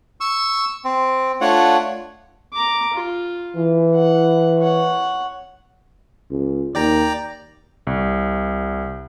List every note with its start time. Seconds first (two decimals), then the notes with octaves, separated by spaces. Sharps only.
0.20 C#6 E6
0.85 C4
1.41 A3 D4 F4 C#5 F#5
2.53 A#5 D6
2.94 F4
3.56 E3
3.95 F#5
4.58 C#5 F#5
6.31 C#2
6.75 D#2 D5 G5 A#5
7.87 C2